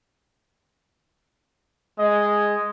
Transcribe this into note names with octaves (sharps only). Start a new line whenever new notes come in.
G#3 D#5